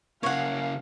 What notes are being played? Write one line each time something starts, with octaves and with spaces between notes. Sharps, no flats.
C#3 A#3 C#5 F5 F#5